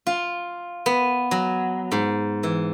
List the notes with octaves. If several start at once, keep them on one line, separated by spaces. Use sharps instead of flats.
F4
B3
F#3
G#2
E3